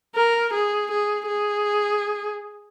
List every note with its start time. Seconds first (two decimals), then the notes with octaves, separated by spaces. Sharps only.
0.16 A#4
0.53 G#4
0.91 G#4
1.28 G#4